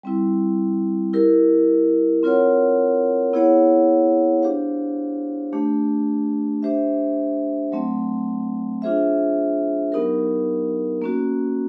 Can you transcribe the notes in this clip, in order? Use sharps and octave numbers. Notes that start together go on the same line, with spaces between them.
G3 C4 E4
E4 G4 A#4
C4 F4 A#4 C#5 F#5
B3 E4 G#4 C#5 F#5
D4 G4 C5 F5
A3 D4 G4
D4 G4 C5 E5
F#3 A3 C4
D4 F4 G#4 C5 E5
F#3 B3 D#4 G4 A#4
A#3 C#4 F#4